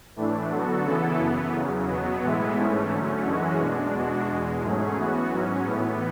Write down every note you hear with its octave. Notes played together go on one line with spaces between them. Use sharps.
A2 E3 A3 D4
D3 F#3 B3 F#4 A4
C#3 E3 B3 E4 A4
F#2 E3 B3
E2 C#3 F#3
B2 F#3 B3
A2 E3 G#3 B3 E4
G#2 E3 A3 C#4
D3 F#3 A3 C#4
F#2 E3 G#3 C#4 F#4
B2 G#3 D4
E2 B2 G#3 D4 F#4
E2 B2 G#3
G#2 F#3 A3 C#4 G#4
E3 B3 F#4
G#2 F#3 C#4
A2 E3 B3